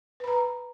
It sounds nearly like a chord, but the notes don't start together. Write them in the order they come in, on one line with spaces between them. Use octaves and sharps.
B4 B5 A#5